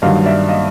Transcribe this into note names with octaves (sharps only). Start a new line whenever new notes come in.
G2 D#3 F#3 D#5 F5
D5 E5
D#5 F5